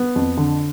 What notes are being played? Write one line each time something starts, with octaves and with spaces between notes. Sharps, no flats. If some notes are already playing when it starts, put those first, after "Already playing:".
Already playing: B3
F2
D3